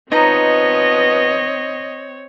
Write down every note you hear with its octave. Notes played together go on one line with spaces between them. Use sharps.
F3 B3 C4 D#4 B4 C#5 D#5 A#5